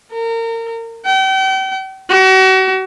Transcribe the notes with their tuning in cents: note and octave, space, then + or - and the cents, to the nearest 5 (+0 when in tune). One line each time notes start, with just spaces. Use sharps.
A#4 -30
G5 -40
F#4 +40